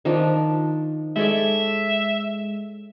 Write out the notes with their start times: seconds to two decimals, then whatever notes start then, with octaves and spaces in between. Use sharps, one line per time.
0.05 D#3 F3 D4
1.16 G#3 A4 C#5 D5 E5